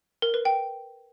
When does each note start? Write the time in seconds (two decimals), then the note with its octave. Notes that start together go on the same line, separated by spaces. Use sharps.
0.22 A#4
0.34 B4
0.45 G5